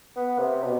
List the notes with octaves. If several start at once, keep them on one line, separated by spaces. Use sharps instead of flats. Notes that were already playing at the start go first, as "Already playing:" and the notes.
B3
C3
B2